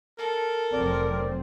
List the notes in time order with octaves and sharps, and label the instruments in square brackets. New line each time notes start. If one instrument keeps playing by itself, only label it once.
[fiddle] A4 [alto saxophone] A#4
[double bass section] F1 F#3 C4 [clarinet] D5